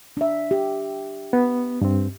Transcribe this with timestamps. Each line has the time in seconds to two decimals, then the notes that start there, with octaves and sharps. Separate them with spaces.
0.17 D4 E5
0.51 G4
1.33 B3
1.81 G2 C4